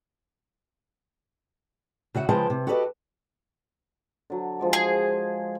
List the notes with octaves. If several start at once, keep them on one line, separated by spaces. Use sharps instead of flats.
C#3 F#4 E5 F#5
C#3 F3 G#3 B4 G5 A5
C3
F#4 G4 A4 B4 C#5 D#5
D3 F#3
F3 G#3 D5
G#4